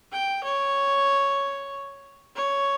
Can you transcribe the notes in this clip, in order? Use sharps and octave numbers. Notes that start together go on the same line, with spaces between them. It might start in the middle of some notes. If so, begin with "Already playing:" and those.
G5
C#5
C#5